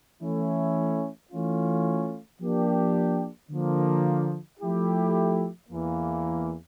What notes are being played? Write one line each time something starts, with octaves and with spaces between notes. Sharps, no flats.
E3 A3 C#4 E4
E3 A3 C#4 F4
F3 A#3 D4 G4
D3 F3 A#3
F3 A3 E4 G4
E2 E3 A#3